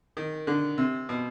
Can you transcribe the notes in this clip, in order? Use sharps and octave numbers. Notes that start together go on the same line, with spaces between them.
D#3
D3
C3
B2